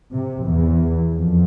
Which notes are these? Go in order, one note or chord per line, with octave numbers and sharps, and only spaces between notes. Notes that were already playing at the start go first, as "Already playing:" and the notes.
C3
E2
F2